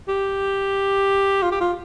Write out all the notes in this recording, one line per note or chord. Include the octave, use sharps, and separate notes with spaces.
G4
F4
G4
F4